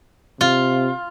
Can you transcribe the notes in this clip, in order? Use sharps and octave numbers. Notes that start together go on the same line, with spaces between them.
C3 F4